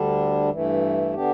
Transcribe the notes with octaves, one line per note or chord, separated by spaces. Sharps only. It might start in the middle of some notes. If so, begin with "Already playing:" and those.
Already playing: D2 D3 G3 D4
G2 E3 A3
D3 B3 D4 G4